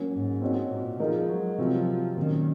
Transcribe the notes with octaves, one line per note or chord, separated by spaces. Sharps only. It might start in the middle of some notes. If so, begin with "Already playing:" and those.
Already playing: F#3 A#3 C#4 F#4
G#2
C4 D#4 F#4 C#5
A#2
F3 G#3 D#4 A#4 D#5
F#3
C3 F3 F#3 C4 D#4
A#2 D#3 F#3 C#4